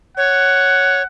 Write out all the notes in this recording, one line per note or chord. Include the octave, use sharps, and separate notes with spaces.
C#5 F#5